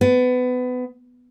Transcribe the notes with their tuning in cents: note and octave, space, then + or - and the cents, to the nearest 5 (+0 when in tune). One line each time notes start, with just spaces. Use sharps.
B3 +25